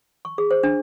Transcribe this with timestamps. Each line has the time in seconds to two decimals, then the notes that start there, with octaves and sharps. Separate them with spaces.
0.25 C#6
0.38 G#4
0.51 C5
0.63 D4